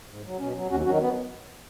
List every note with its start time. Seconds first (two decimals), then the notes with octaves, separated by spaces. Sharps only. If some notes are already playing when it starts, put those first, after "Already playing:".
0.09 G#2
0.25 F#3
0.39 B2 C#4
0.55 F#3
0.70 D#2 C#4 F#4
0.85 D#3 F#3 C#4 F#4
1.00 B3